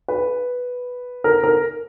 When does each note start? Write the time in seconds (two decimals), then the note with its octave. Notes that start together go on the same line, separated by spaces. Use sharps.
0.08 B4
1.24 A#4
1.43 A#4